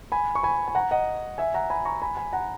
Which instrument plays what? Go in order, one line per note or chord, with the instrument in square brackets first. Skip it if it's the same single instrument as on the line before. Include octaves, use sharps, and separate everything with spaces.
[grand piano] G#5 B5
C#6
G#5 B5
G#5
F#5 A#5
D#5 F#5
E5 G#5
F#5 A#5
G#5 B5
A#5 C#6
G#5 B5
G#5 B5
F#5 A#5